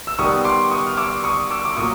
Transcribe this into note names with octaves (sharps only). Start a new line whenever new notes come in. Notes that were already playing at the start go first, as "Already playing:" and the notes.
E6
D#3 G3 B3 C#6 D#6
C6 D6
C#6 D#6
F6
D6 E6
C#6 D#6
D6 E6
D6
A#2 F#3 C#6 D#6